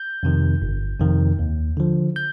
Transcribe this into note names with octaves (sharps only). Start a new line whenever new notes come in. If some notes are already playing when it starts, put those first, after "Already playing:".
Already playing: G6
F2 C3 D#3
G1
F2 C3 D#3
D#2
D3 F3
G6